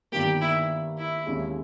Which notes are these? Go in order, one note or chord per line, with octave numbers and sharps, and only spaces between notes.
G1 G2 D#3 G3 A#3 G4
E4
E4
D#2 C#3 G#3 C#4 E4